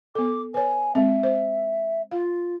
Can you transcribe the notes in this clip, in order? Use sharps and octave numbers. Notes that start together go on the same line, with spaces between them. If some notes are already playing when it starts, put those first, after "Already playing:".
B3 A4 D6
B4 C#5 G#5
G#3 C4 E5
C5
F4 F5